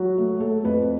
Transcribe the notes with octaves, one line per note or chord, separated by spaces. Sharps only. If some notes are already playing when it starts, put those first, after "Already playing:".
Already playing: F#3 F#4
A3
A3 A4
F2 B4